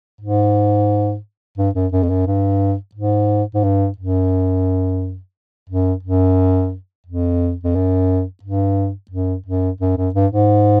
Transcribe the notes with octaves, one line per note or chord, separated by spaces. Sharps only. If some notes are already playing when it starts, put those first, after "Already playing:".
G#2
G2
F#2
F#2
F2
F#2
G2
G#2
G#2
G2
F#2
F#2
F#2
F2
F2
F#2
G2
F#2
F#2
F#2
F#2
G2
G#2